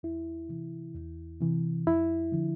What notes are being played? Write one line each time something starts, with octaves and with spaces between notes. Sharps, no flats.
E2 E4
C3 E3
E2
C3 E3
F2 E4
D3 F3